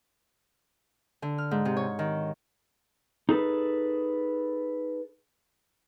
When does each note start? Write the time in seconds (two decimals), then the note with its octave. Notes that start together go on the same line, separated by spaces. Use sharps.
1.22 D3
1.38 F6
1.51 G#2
1.65 C3
1.77 C#5
1.99 D#3
3.29 D#4 G#4 A4 B4